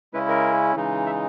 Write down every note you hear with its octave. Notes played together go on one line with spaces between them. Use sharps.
C#3 G#3 C#4 E4 B4
A#4
C#3 E3 G#3 D#4
E5